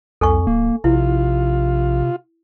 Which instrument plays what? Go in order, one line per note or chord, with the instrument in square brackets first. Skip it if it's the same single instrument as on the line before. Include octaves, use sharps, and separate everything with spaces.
[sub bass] C2 [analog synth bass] F2 [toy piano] A4 G#5 C#6
[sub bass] D1 [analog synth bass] A#3
[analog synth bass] A#1 [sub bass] C3 [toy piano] E4 [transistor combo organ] F4